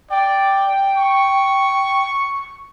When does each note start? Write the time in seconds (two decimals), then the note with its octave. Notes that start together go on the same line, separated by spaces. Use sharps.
0.10 D5 G5
0.97 C#6